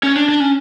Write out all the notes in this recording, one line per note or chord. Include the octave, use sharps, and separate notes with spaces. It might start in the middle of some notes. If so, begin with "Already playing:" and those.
C#4
D4
D4
C#4